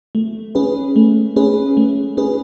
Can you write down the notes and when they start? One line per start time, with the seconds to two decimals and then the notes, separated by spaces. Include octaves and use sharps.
0.15 A3
0.55 C#4 G#4 B4
0.96 A3
1.36 C#4 G#4 B4
1.77 A3
2.17 C#4 G#4 B4